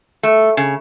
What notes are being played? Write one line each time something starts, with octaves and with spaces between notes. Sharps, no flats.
A3
C#3